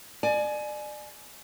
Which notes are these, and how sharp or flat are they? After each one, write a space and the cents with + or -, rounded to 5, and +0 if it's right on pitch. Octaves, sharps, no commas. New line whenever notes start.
D5 +35 G#5 +25